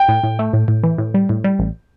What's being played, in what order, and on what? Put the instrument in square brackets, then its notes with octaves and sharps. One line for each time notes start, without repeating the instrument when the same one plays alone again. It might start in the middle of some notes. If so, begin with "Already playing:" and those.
Already playing: [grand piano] G5
[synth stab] A2
A2
A3
A2
A2
E3
A2
G3
A2
G3
A1